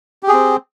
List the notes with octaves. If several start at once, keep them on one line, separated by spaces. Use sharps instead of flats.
C4 G4 G#4